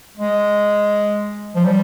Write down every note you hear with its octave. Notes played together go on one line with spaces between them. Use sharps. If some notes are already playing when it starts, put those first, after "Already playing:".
G#3
F3
G3